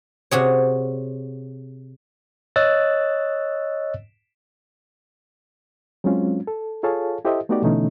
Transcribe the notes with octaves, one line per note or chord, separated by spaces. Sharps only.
C3 F#4 G#4 C#5
C#5 D#5 E6 F#6 A6
F#3 G#3 C4 C#4 F4
A4
F4 G#4 A4 C#5 F5 A5
E4 G4 A4 C5 D#5 E5
A3 B3 D#4 F#4 G4 D5
B2 D3 E3 A3 C#4 D#4